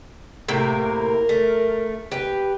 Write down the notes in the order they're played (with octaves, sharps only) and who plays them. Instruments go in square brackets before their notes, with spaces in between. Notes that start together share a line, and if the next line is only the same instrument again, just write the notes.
[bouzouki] A2 C3 A#3
[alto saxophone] A#4
[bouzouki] A3
G4 B4